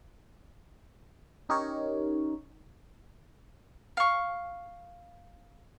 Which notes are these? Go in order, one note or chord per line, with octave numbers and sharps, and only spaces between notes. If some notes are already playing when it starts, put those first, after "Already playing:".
C#4 D#4 G4 A#4 C#5
F5 C#6